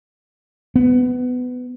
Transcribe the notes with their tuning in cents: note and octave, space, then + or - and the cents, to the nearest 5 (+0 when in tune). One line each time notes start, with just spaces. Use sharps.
B3 +20